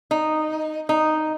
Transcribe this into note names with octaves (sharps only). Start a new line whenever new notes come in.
D#4
D#4